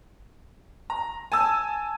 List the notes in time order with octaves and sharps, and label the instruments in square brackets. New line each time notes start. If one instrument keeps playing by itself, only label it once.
[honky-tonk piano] A#5
G#5 A5 E6